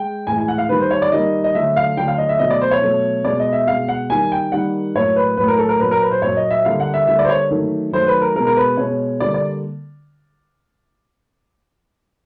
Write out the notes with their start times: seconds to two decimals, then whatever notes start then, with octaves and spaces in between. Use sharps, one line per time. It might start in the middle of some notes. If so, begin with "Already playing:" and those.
Already playing: G#3 G5
0.27 A2 E3 G#3 G#5
0.38 G#5
0.48 F#5
0.58 F5
0.69 D#3 G3 A#3 B4
0.80 C5
0.91 C#5
1.02 D5
1.11 D#3 G3 A#3 D#5
1.44 D#5
1.55 D3 F#3 A3 E5
1.76 F5
1.97 D3 F#3 A3 G5
2.08 F5
2.18 D#5
2.29 E5
2.39 B2 F#3 A3 D#5
2.51 D5
2.61 C5
2.71 C#5
2.82 B2 F#3 A3
3.25 B2 G#3 D5
3.40 D#5
3.53 E5
3.67 B2 G#3 F5
3.88 F#5
4.10 D#3 G3 A#3 G#5
4.32 G5
4.52 D#3 G3 A#3 F#5
4.94 A2 F#3 A#3 C#5
5.16 B4
5.37 A2 F#3 A#3 B4
5.48 A#4
5.59 A4
5.69 A#4
5.80 A#2 F#3 A#3 B4
5.91 A#4
6.02 B4
6.11 C5
6.22 A#2 F#3 A#3 C#5
6.37 D#5
6.51 E5
6.65 D3 G3 A#3 F5
6.80 F#5
6.94 E5
7.07 D3 G3 A#3 E5
7.19 D5
7.24 C5
7.29 C#5
7.51 D#3 F#3 A3
7.92 D#3 F#3 A3 C5
8.07 B4
8.22 A#4
8.35 G#3 A#4
8.39 B2
8.47 A#4
8.56 B4
8.77 B2 G#3 C#5
9.20 D3 G3 A#3 D5
9.34 D5